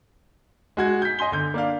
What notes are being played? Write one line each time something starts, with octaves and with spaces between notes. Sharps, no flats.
G#3 F#4 G#6
G6 B6
D#5 G#5 C6 G7
D3 G6
A#3 D4 F5